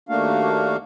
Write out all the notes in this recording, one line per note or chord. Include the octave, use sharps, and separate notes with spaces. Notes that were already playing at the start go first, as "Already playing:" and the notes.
D#2 A3 A#3 D4 F#4 F5